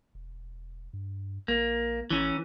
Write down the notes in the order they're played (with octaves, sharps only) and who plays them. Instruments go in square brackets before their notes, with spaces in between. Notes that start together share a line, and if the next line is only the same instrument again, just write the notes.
[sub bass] E1
G2
[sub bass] A#1 [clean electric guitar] A#3
[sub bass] A1 [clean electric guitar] E3 C#4